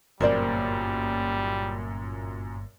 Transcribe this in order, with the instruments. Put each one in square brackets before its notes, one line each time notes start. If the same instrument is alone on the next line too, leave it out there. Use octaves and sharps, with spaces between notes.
[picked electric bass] G1 A#3 [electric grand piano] F#2 A#2 [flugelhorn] G3 [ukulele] A#4 C5 D5